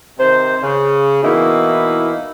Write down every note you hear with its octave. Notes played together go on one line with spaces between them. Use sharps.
C3 D#3 C5
C#3
B2 E3 A#3 D#4 E4